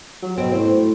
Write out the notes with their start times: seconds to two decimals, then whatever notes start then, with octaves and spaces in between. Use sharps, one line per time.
0.23 F#3
0.38 B2 C4
0.53 A2 C4